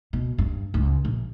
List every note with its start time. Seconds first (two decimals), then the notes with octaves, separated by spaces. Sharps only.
0.13 B2
0.38 G2
0.74 C#2
1.05 A#1